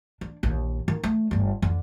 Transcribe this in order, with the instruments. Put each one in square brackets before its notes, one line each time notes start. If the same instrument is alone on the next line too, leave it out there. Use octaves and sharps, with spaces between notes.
[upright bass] D4
A#1 D#2
D#3
A3
G1 D4
F2 D3